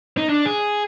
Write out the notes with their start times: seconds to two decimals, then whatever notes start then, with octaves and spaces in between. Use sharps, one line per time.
0.17 D#4
0.29 D4
0.46 G#4